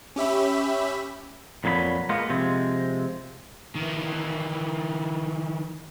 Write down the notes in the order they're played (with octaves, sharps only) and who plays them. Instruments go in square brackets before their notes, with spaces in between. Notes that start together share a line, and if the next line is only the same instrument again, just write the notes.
[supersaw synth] C#4 G4 E5 B5
[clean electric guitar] F2 A#2 F#3 G#4 B5
G#3 A#3 B3 F4
C3 F3 G#3 C4
[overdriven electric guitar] D#3 E3